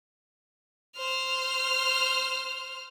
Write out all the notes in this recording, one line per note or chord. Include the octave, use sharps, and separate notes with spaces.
C5 F6